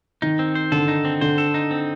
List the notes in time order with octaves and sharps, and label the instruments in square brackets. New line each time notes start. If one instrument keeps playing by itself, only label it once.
[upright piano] D#3 [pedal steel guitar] D#4
[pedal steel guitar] C4
C5
[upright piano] D3 [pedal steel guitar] A4
[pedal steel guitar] D#4
C4
[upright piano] D3 [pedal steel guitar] C5
[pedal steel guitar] A4
D#4
C4